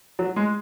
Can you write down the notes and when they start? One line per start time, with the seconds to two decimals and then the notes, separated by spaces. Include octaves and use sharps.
0.19 F#3
0.36 G#3